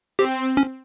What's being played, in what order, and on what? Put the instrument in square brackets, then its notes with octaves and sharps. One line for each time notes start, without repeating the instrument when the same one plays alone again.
[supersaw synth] C4 [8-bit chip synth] G4
[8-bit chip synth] C#4